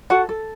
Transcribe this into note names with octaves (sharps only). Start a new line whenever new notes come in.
F#4 A4 F#5
A4